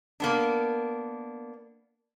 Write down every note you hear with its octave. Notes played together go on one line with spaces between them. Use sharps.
A#3 B3 D4